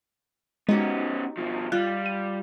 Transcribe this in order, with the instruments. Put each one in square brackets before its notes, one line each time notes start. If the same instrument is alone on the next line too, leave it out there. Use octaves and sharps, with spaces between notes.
[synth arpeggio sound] G#3 [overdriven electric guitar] B3 C#4 [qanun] D#4 F#4 G4
[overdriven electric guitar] B2 F3
[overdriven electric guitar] G3 [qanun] F4 [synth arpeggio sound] F#6
[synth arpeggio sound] D#7